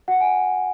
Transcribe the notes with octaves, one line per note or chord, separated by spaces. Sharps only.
F#4 F#5
G#5